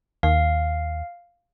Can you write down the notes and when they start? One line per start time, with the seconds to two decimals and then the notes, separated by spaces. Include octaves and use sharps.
0.23 D#2 F5